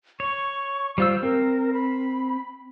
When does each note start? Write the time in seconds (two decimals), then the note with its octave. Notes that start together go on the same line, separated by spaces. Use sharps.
0.20 C#5 C#6
0.98 G3 F4 C5 E6
1.23 C4 A#4
1.73 B5